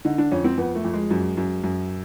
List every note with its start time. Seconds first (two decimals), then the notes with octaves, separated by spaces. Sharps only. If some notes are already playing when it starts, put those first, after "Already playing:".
0.05 D3 D#4
0.18 D4
0.31 F2 C#4
0.44 C4
0.57 F2 B3
0.75 A3
0.84 F2
0.93 G#3
1.10 F#2
1.37 F#2
1.63 F#2